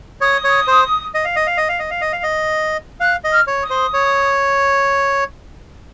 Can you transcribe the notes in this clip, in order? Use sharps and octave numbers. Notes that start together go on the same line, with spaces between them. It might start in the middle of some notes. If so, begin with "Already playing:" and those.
C#5 D#6
C#5
C5
D#5
F5
D#5
F5
D#5
F5
D#5
F5
D#5
F5
D#5
F5 F#6
D#5
F6
C#5
D#6
C5
C#5